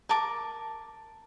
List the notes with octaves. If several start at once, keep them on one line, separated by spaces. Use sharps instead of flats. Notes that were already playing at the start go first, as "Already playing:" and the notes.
A#4 A5 D6